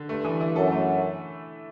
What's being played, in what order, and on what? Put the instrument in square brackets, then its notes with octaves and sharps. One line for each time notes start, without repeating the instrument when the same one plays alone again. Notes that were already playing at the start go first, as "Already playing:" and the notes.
Already playing: [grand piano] D3
[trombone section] G2 [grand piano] A3
[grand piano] E3
E4
[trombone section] F#2 [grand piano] A4
[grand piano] A3